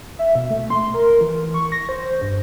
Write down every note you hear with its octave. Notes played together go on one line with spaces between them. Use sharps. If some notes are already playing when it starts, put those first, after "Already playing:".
E5
B2
A3
C6
A#4
E3
C#6
A#6
C5
G2